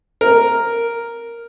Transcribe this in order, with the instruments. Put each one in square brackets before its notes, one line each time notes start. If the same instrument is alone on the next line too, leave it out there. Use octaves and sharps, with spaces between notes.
[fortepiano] A#4